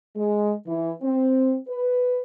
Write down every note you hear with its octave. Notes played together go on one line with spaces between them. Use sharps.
G#3
E3
C4
B4